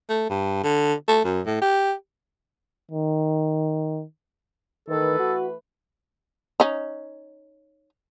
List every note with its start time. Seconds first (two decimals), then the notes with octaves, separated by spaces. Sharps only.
0.09 A3
0.30 G2
0.63 D3
1.08 A3
1.24 F#2
1.46 A2
1.62 G4
2.91 D#3
4.88 D#3 E3 A3 A4 B4
5.19 F#4
6.60 C#4 D#4